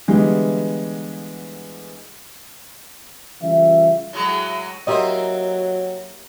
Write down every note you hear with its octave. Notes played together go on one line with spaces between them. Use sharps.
D3 E3 G3 G#3 B3
C#3 E3 G3 F4 E5
A2 F#3 G#3
F#3 A#3 C4 E4 G4 C5 D#5